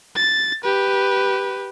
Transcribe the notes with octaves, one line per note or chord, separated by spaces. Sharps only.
A6
G4 B4